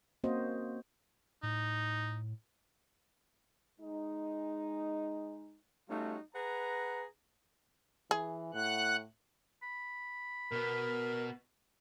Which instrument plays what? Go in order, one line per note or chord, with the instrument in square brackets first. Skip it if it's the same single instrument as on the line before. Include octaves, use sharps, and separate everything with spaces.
[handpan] A#3 C4 C#4 F#4 C5 D#5
[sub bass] A2 [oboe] D#4
[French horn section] G#3 D#4
[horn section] G3 A3 C#4 D#4 F4 F#4
G#4 B4 F#5 A#5
[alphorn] E3 [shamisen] G#4
[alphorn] A2 [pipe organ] F#5 F#6
[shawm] B5
[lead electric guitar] B2 B3 [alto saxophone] A#4